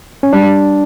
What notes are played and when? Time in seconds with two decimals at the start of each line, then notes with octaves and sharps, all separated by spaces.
0.23 C#4
0.33 G3 D4